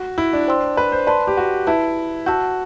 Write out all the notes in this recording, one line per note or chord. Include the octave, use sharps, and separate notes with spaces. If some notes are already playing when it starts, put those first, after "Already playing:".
Already playing: F#4
E4
D4
C5 G5 C6 E6
B4
C5
B4 D5 A5 C6
G4
F#4
E4 B4 E5 A5
F#4 F#5 A5 E6 G6